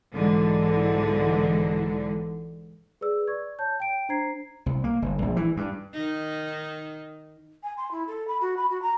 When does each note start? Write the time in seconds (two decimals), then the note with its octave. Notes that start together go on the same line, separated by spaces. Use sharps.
0.14 B1 G#2 D3 E3
3.01 G#4 B4 D5 E6
3.28 D5 C#6 G#6
3.59 C#5 A5 G6
3.80 G5 D7
4.09 D4 C5 A#5 G#6 C7
4.66 C2
4.84 A#3
5.02 G1
5.22 A#1
5.37 E3
5.57 G2
5.94 D#3 D#4
7.63 G#5
7.77 C6
7.91 E4
8.07 A4
8.28 B5
8.41 F#4
8.57 B5
8.70 F#4
8.82 A#5